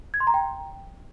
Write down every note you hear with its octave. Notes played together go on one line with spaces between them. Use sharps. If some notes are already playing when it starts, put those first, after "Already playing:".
G#6
C6
A#5
G5